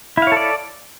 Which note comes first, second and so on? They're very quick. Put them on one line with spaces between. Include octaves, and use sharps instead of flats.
E4 F5 C#5 A4 D5